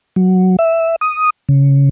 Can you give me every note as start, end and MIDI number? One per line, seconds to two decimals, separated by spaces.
0.16 0.56 54
0.59 0.96 76
1.01 1.30 87
1.49 1.89 49